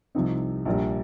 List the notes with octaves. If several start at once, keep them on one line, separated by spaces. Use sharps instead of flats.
C2 C3 F3 C4 D#4
A#1 A#2 G3